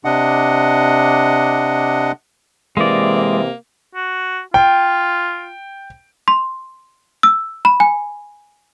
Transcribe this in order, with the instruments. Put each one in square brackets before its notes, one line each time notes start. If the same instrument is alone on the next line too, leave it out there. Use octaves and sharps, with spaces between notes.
[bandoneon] C3 D4 D#5 F#5
[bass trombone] C3 [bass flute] E3 [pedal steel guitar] G#3 D5 [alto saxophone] A#3
[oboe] F#4
[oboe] F4 [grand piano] G5
[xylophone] C6
E6
B5
G#5